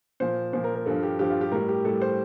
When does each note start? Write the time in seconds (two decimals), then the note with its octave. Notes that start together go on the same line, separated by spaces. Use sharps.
0.20 A#2 F3 C5
0.53 A#2 F3 C5
0.64 A#4
0.75 A#4
0.86 G2 F3 A4
1.03 G4
1.19 G2 F3 G4
1.30 F4
1.41 G4
1.52 A2 G3 A#4
1.69 G4
1.85 A2 G3 A4
2.02 C5